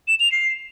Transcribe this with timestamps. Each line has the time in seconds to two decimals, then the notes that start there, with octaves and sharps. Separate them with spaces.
0.08 E7
0.20 F7
0.32 C7